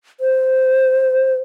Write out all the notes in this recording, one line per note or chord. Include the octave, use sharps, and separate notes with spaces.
C5